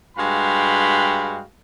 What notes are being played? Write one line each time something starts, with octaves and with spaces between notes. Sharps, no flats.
G2 G#3 F#4 F5 G5 B5